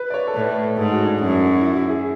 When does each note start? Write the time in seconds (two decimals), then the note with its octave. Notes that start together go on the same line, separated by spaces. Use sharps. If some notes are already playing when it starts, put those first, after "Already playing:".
Already playing: B4
0.10 D5
0.14 C#5
0.27 A4
0.35 A2 B4
0.77 G#2 A4
0.91 F#4
1.05 D4
1.20 F#2
1.61 E4
1.77 E4
1.89 G#4